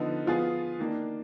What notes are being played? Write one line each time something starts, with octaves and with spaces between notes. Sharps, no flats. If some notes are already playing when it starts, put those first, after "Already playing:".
Already playing: D3 F3 B3 D#4
F3 B3 F4 G#4
D#3 A#3 D4